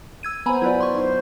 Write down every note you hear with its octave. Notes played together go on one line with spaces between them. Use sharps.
E6 G#6 D#7
B3 C5 G#5 A#5 B5
F#3 E4 F4 B4 D5
C6 C#6
D#4 C5